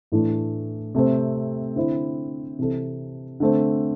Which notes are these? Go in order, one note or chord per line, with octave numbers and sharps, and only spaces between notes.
A2 E3 A3 D4
C3 A3 C4
D3 C4 E4
C3 E3 C4 A4
D3 A3 C4